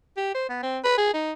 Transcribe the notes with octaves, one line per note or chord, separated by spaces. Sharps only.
G4
C5
B3
C4
B4
G#4
D#4